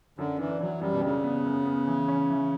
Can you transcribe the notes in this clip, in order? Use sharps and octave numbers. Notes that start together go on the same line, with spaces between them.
F#2 D3
E3 D4
E3 F#3
F#2 G3
B2
C#3 D4
B3
F#2
B3
E3
C#4
E3